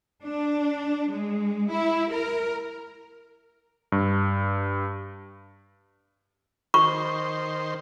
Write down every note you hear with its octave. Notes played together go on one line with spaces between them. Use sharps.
D4
G#3
E4
A#4
G2
D#3 C5 C#6